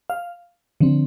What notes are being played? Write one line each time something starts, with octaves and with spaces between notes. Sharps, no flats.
F5
D3 F3 C4